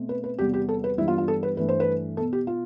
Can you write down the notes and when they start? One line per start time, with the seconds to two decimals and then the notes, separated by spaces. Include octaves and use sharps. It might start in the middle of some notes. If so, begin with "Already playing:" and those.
Already playing: B2 A3 C4
0.09 B4
0.24 B4
0.39 E2 C3 G3 B3 G4
0.54 G4
0.69 A4
0.84 B4
0.98 G2 E3 G3 B3 E4
1.08 F4
1.18 F4
1.28 A4
1.43 B4
1.57 G2 E3 A3 B4
1.69 C5
1.80 B4
2.17 B2 B3 A4
2.33 G4
2.47 F4